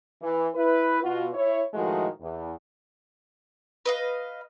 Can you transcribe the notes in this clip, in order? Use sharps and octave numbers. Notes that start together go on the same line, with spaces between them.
E3
E4 B4
B2 F4 F#4
E4 C#5
A2 D#3 F3 G#3 A3 F#4
E2
B4 D#5 F5